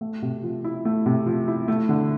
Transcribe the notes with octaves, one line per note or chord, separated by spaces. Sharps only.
A3
C3
F3
E4
A3
C3
F3
E4
A3
D3